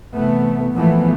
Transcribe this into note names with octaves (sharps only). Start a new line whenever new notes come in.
C3 E3 A3 B3
A#2 E3 F3 A3 B3